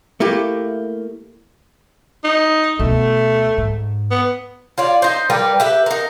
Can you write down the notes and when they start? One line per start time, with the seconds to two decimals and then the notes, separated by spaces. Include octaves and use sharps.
0.20 A3 A#3 E4 G4
2.24 D#4
2.79 D2 B2 A3
3.58 G#2
4.11 B3
4.78 F4 C#5 D5
5.02 D#4 C5
5.30 G3 A#4 B4 D5
5.60 G4 B4 E5
5.86 D#4 A#4